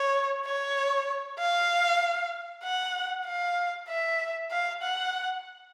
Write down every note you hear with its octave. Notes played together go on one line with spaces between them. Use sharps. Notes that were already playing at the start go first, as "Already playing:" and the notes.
Already playing: C#5
C#5
F5
F#5
F5
E5
F5
F#5